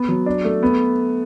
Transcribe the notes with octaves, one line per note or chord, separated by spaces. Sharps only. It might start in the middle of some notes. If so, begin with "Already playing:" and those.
Already playing: B3
F#3
D4
A3
B3